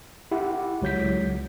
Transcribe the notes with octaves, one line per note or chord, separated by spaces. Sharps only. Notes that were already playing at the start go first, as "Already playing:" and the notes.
E4 G4 F#5
C#2 F#3 G6 B6